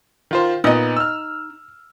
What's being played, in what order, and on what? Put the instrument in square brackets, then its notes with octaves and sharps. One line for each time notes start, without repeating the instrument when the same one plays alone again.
[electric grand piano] D#3 F4 C5
[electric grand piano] A#2 B3 [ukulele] D#4 D#5
[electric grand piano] E6 F6